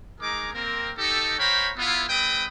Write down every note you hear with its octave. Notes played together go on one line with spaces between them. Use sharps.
G#3 D#4 G#4 A#4 A#5 D6
A#3 C4 A#4
D#4 G4 A4
C5 C#5 F5 G5 A#5 B5
B3 E4 F4
G#3 C4 B4 G5 B5 D#6